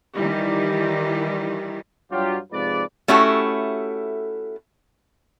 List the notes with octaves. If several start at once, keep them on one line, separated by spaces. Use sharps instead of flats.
D#3 E3 G3
G2 F#3 F4 G4
G#2 C3 F3 G#4 B4 D5
A3 C#4 E4 F#4 G4 A4